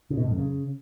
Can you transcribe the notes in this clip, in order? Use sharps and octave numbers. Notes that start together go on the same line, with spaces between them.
C#3
B2
A2
F#2
C#3